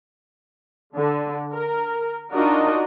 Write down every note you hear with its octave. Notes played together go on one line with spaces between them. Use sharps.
D3
A#4
D4 D#4 F4 F#4 A#4 D#5